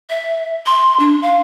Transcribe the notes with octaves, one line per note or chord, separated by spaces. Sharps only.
E5
C6
D4
F5